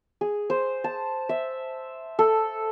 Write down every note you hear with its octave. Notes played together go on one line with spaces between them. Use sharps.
G#4
C5
A5
E5
A4